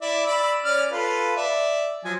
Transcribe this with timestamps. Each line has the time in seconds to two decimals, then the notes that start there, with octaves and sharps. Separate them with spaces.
0.02 E4 D5 E5
0.26 D5 B5 E6
0.65 C#4 D5 F6
0.91 F4 A4 B4
1.36 D5 E5
2.04 F3 F#3 G#5